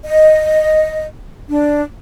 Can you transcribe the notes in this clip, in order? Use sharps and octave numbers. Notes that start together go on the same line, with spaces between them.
D#5
D4